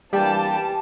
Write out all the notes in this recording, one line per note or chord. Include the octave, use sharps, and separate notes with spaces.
E3 G3 A#3 D4 G4 G5 A5